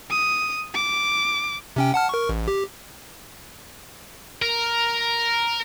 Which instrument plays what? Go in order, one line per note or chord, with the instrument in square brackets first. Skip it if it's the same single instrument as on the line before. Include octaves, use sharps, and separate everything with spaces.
[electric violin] D#6
D6
[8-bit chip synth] C3 C#4 G5
F#5 A5 F6
A#4 C#6
A1
G4
[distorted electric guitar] A#4